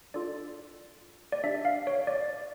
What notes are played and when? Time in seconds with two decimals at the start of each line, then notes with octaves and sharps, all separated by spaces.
0.14 D4 F4 A4 D5
1.32 D5
1.44 D4 G4 E5
1.65 F5
1.87 C#5
2.07 D5